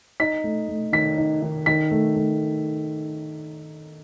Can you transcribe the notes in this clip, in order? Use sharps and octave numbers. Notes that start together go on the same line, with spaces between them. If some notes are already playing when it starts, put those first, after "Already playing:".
D#4 B6
A3
A3
D#3 B6
D#4
D#3
D#3 B6
A3
A3